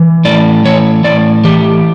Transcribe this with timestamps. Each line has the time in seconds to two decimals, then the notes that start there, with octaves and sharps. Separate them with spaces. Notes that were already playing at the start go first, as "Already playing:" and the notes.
Already playing: E3
0.25 A2 D5
0.64 E3 C#5
1.04 A2 D5
1.44 E3 G4